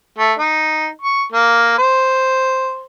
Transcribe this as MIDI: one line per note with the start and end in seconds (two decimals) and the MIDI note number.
0.18 0.33 57
0.39 0.88 63
1.01 1.24 85
1.32 1.76 58
1.78 2.85 72